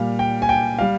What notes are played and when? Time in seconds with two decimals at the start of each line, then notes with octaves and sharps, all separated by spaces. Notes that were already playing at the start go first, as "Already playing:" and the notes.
Already playing: A#2 G3 F5
0.19 G5
0.42 G#5
0.49 G5
0.79 G3 F5